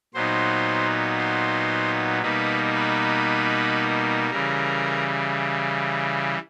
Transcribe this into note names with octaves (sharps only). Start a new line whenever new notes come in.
A#2 F#3 B3 D#4 C5
C5
B2 G3 A#3 D#4 B4
B4
C#3 E3 G3 A#4